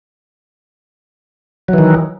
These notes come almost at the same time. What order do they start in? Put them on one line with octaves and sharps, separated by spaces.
F#3 E3 D#3